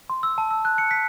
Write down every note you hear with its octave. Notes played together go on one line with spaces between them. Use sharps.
C6
E6
A5
E6
F#6
C#7
B6